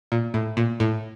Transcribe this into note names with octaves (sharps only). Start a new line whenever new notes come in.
A#2
A2
A#2
A2